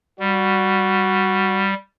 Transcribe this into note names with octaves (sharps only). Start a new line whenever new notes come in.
G3 F#4